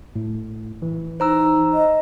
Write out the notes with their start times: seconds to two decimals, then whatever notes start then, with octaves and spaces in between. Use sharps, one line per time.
0.16 A2
0.82 E3
1.20 D#4 C5 A#5 E6
1.74 D#5